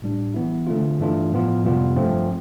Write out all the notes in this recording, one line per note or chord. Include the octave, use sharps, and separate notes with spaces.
A2 G3 D4
E3 B3 E4
D3 A3 C4 F4
G2 E3 A3 D4 F4
A2 F3 B3 F4
F2 C3 G3 B3 F4
G2 F3 A3 C4 F4